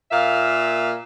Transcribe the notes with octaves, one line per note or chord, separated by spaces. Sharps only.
A#2 A#3 E5 F5